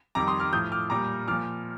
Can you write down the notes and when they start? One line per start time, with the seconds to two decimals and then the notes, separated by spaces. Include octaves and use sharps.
0.15 F2 D#3 G3 A#5 D6
0.27 C6 D#6
0.40 D6 F6
0.53 A2 F3 D#6 G6
0.72 D6 F6
0.90 A#2 G3 A#5 D6
1.27 A#2 F3 D6 F6